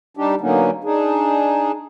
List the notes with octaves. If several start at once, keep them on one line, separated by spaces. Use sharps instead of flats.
G3 D4 D#4 G4
D3 F#3 A#3 B3 C#4 D#4
D4 D#4 G#4